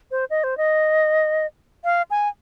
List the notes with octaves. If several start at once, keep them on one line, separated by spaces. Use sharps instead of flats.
C5
D#5
C5
D#5
F5
G#5